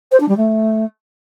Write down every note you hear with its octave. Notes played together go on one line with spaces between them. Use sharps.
C5
D4
G3
A3